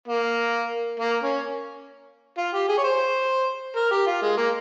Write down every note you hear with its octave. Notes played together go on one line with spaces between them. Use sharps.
A#3
A#3
C#4
F4
G4
G#4
C#5
C5
A#4
G4
F4
G#3
A#3